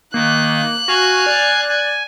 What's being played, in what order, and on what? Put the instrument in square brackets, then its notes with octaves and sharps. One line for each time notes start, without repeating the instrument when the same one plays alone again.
[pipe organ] D#3 [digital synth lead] A#3 [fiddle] F#6
[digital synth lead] F#4 [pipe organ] F5 G#5
[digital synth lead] D5
[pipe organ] G#5